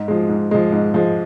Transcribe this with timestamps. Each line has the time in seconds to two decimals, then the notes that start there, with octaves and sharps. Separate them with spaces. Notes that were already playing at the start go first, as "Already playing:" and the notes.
Already playing: G#2
0.08 F3 G#3
0.29 G#2
0.51 F3 G#3
0.72 G#2
0.94 F3 G#3